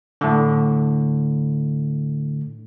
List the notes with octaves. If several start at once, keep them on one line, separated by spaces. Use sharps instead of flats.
A2 D3